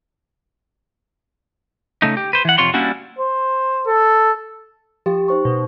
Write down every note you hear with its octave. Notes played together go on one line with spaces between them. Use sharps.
C#3 A3 D#4
G4
B4 C5
E3 F#5
F2 C3 F4 C#5 C6
G3 A#3 C#4 D4 E4 F#4
C5
A4
F3 G4
D#4 C5 C#6
B2